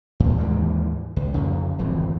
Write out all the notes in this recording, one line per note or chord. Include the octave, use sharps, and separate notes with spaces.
D#2 A#2
D#2 G#2 E3 G3
C#2
F2 C#3
D1 G#1 F2 E3